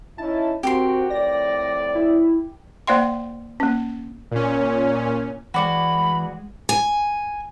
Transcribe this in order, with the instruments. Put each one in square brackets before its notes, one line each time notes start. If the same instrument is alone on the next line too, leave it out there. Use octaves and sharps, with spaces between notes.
[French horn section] C#4 D#4 E4 [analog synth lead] A5
[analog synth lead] C4 [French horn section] F#4 [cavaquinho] G4 A#4 C6
[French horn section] F2 A2 D5 [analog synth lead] A#6
[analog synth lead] E4
[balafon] A#3 C5 D5 F5 G5 C6
A#3 C#4
[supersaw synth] A#2 C#4
[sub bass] E3 [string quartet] G#3 [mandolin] F#4 D5 F#5 [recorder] B5
[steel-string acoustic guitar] G#5